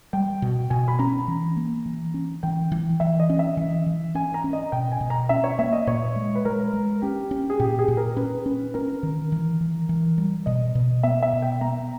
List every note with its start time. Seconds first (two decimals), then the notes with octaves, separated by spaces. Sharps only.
0.13 G3 G5
0.42 B2
0.70 B2 G#5
0.88 B5
0.99 C#4 A#5
1.28 E3
1.57 A#3
1.86 E3
2.14 C#4
2.43 E3 G5
2.72 E3
3.00 E3 E5
3.20 D#5
3.30 C#4
3.39 E5
3.57 E3
3.86 E3
4.15 C#4 G#5
4.34 A#5
4.44 C#4
4.53 D#5
4.72 B2 G5
4.92 G#5
5.01 B2
5.10 A#5
5.29 C#4 E5
5.44 C#5
5.59 A#3 E5
5.73 D#5
5.87 A#2 C#5
6.16 G#3
6.35 B4
6.45 G#3 A#4
6.73 G#3
7.02 C#4 G4
7.31 C#4
7.50 G#4
7.60 A#2 G4
7.79 G#4
7.88 A#2
7.97 A#4
8.16 C#4 B4
8.46 C#4
8.74 C#4 A#4
9.03 D#3
9.32 E3
9.61 E3
9.89 E3
10.18 G3
10.46 B2 D#5
10.75 B2
11.03 B3 E5
11.23 E5
11.33 B2
11.42 G5
11.61 B3 A#5